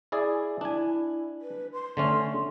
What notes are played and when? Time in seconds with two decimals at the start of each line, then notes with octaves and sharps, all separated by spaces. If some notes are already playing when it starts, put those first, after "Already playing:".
0.12 E4 G#4 D5
0.61 D4 E4 G#5
1.41 B4
1.74 C6
1.97 D3 A3 C#4